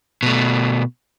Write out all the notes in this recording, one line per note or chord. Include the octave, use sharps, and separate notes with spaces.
B2 A3